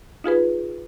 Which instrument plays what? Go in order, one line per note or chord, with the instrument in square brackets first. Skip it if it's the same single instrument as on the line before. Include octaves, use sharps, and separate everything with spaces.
[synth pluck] D#4 F4 G#4 B4